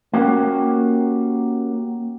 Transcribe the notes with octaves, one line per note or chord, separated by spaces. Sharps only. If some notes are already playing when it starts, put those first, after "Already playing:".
A#3 C#4 F#4 G4